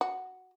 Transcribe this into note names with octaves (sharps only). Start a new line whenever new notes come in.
F#4